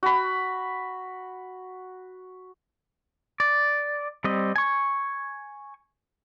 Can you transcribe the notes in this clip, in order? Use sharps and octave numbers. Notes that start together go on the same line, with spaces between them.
F#4 B5
D5
G3 C4 D#5
G#5 C#6